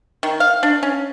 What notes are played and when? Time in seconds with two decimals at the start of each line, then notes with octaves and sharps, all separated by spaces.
0.23 D#3
0.40 F5
0.63 D4
0.83 C#4